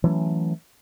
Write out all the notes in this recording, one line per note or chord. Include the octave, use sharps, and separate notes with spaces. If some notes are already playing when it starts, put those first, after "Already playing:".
E3 F#3 A3 C#4